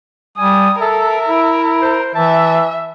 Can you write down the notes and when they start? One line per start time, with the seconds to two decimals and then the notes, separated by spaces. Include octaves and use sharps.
0.38 G3 G#5 D#6
0.81 A4 A#4 E5
1.28 E4
1.82 C5
2.15 E3 E5 A5